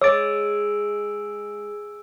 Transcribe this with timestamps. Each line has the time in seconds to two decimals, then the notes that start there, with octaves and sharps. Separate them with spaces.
0.01 G#3 C#5 D6 E6 A6 D7